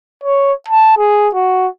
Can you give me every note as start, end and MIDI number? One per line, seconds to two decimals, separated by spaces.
0.24 0.53 73
0.68 0.96 81
0.98 1.29 68
1.34 1.67 66